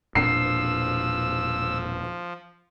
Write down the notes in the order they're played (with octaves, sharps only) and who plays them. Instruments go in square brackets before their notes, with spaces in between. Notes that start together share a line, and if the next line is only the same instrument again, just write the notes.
[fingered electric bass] E1 A#2 D4 [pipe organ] F3 [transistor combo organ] E6 [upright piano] C7